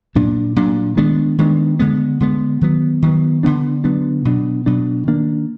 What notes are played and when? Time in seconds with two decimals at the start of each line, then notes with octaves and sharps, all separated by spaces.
0.15 A#2 F#3 D4
0.56 A#2 F#3 D4
0.97 D#3 G#3 B3 D4
1.38 D#3 G#3 B3 D4
1.79 D3 G#3 B3
2.20 D3 G#3 B3
2.61 D#3 F#3 B3
3.02 D#3 F#3 B3
3.43 D3 F#3 B3 D4
3.84 D3 F#3 B3 D4
4.25 B2 F#3 D4
4.66 B2 F#3 D4
5.07 D#3 A#3 D4